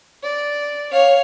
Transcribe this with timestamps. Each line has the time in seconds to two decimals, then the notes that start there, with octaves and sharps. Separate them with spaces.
0.23 D5
0.92 C#5 F5